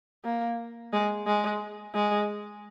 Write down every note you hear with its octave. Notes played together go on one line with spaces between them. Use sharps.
A#3
G#3
G#3
G#3